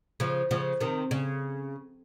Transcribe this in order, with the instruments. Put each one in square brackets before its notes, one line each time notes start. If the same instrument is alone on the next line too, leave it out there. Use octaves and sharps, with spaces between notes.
[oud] C#3 F3
C#3 F3
C3 D#3
C#3